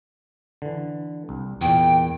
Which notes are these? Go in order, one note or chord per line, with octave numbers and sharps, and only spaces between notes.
D3 E3
C2
E2 A#2 G5